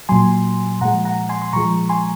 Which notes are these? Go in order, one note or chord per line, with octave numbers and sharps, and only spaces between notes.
A#2 F#3 G#5 C6
A#2 F3 G#3 F#5 A#5
F#5 A#5
G#5 C6
C6
A#2 F3 G#3 A#5 C#6
G#5 C6